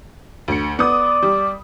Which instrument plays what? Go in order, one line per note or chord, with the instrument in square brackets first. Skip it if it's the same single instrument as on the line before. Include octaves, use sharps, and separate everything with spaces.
[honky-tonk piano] D2 C#7
[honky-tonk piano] B3 D#6 [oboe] D5
[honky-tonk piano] G3